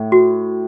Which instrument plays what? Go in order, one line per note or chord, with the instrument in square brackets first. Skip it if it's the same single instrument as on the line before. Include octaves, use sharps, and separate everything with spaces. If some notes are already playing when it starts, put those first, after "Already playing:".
Already playing: [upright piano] A2
[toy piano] F#4